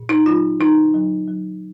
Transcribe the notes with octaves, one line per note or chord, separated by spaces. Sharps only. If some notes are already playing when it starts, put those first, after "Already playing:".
Already playing: A#2
D#4
F#3 F4
D3 D#4
F#3
F#3